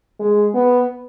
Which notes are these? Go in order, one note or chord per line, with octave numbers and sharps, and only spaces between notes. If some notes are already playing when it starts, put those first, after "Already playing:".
G#3
B3